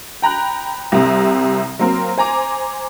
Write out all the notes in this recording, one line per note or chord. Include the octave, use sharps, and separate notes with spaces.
G5 A#5 B5 F#6
C2 C3
F#3 A#3 C4 A#4
C5 G#5 A#5 D6